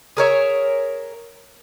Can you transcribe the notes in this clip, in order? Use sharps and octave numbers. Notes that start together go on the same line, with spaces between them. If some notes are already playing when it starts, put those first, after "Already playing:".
G#4 A#4 C#5 E5